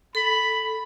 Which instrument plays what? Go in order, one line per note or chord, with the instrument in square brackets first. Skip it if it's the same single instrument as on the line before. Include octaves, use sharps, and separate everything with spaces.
[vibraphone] A4 [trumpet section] B5